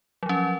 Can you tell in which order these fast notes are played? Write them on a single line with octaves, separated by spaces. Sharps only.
F#3 F3 C#4